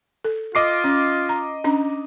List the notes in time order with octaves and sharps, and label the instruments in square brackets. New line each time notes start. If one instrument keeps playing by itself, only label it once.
[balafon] A4
[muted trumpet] F4 [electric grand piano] D#5 D6 C7
[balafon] C#4
A#5
C#4 D4 A#5